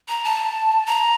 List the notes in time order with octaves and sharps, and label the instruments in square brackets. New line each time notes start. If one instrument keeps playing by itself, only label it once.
[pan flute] A#5
A5
A#5